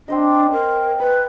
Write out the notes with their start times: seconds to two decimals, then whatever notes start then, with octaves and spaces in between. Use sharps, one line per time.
0.08 C4 D4 C5 D#5
0.52 A#4
1.00 B4 B5